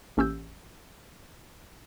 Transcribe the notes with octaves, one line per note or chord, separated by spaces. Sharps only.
A1 A#3 C#4 G4 E6 G6